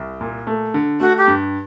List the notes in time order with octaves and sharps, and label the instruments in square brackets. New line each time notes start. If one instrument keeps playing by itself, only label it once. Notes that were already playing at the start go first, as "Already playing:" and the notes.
Already playing: [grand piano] C2
A#2
A3
D3
[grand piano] A3 [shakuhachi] F#4
[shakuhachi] G4
[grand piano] G2